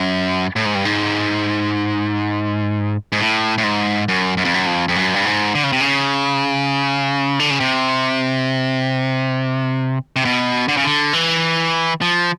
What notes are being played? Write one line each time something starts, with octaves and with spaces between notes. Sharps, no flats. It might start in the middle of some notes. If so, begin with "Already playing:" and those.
Already playing: F#2
A2
G#2
G2
G#2
G#2
A2
A2
G#2
F#2
F#2
F2
F#2
F2
F2
F#2
G2
G#2
D3
C#3
C3
C#3
D3
C#3
C3
C3
B2
D3
C#3
D3
E3
F3